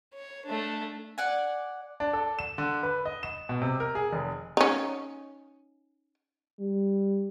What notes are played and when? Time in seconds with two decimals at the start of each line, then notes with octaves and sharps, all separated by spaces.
0.15 C#5
0.46 A3 D4
1.18 D5 F#5 G#5
2.00 D4
2.13 A4
2.39 E7
2.58 D3
2.83 B4
3.05 D#5
3.23 E7
3.49 B2
3.61 C3
3.80 A#4
3.95 G#4
4.13 F1
4.57 C#4 D#4
6.60 G3